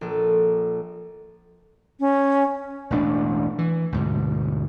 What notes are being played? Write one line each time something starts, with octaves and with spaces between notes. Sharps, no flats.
A#1 A4
C#4
E1 A1 D4
E3
D2 G#2 B2